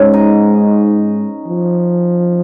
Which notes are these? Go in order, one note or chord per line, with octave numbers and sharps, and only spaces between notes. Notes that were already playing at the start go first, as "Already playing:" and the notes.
Already playing: G#2 C#4
D#4
F3